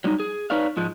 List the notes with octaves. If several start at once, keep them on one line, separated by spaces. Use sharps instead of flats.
F#3 G3 C#4 D#4
G#4
D#4 B4 C#5 D5 F5
G#2 F3 G#3